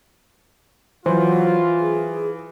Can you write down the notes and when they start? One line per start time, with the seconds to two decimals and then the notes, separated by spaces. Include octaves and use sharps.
1.06 E3 F#3 F4 C5
1.81 G#4